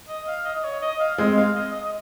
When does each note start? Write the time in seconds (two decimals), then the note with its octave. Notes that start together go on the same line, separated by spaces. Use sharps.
0.09 D#5
0.27 F5
0.45 D#5
0.56 D#5
0.64 C#5
0.82 D#5
1.00 F5
1.18 G#3 C4 D#5
1.37 F5
1.55 D#5
1.73 D#5
1.85 D#5